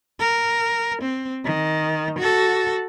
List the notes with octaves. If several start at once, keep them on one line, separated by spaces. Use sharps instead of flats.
A#4
C4
D#3
F#4 A4